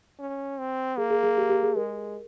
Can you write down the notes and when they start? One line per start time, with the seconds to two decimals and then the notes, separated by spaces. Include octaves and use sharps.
0.20 C#4
0.59 C4
0.97 A#3 G#4
1.10 G#4
1.23 G#4
1.37 G4
1.49 G4
1.63 G#4
1.76 G#3 A#4